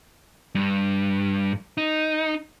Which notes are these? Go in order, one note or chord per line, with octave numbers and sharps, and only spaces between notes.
G2
D#4